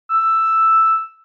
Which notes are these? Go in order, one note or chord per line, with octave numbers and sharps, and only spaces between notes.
E6